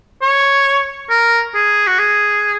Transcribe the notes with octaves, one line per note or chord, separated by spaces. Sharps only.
C#5
A#4
G#4
F#4
G#4